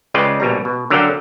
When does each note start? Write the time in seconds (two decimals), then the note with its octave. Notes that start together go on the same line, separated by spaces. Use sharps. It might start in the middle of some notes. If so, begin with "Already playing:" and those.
0.14 C#3 G#3 F4 B4 D5 G5
0.40 A#1 B2 G3 A#5
0.65 B2
0.90 D3 F#3 A#4 D5 F5 G5